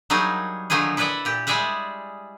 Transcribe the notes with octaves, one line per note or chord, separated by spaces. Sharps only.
F#3 G3 A#3 D#4 G#4
D3 D#3 F3 F#3 D#4 G#4
E4 A4 B4 D5 E5 F#5
A#2 G4
G3 G#3 G#4 D5 E5 F#5